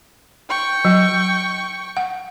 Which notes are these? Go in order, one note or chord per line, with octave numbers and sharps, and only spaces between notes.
G5 C#6
F#3
F#5